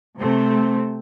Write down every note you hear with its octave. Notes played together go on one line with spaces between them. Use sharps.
C3 A3 C4